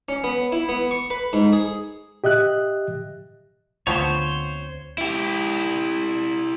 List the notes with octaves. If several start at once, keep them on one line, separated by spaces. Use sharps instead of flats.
C#4
B3
E4
B3
C#6
B4
G#2
G#4
G4 D#5 E5 F#6
D2 D3 F3 A3 B3 C4 C5 C#5
E4 G4